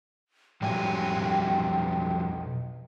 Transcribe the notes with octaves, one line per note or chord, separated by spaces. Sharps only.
B1 F2 F#3 G3 G5 G#5